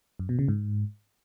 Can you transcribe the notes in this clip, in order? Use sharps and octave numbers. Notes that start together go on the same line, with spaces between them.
F#2
B2
C#3
G#2